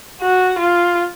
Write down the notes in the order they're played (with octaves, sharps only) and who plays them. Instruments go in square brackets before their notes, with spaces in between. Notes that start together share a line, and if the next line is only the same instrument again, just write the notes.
[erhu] F#4
F4